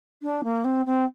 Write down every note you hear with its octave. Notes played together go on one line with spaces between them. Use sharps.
D4
A#3
C4
C4